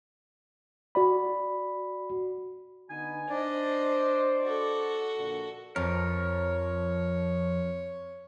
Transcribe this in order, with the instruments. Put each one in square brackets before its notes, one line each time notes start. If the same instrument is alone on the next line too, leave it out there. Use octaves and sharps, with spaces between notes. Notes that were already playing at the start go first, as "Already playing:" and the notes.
[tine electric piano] F#4 D5 B5
[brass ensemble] D3 B3 D#4 [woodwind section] G#5
[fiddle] D4 D#5 [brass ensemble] C5 [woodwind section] D5
[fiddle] F#4 A4
[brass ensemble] A#1 A#2 D3
[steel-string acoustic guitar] F2 [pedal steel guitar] F3 A#4 [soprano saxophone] C#5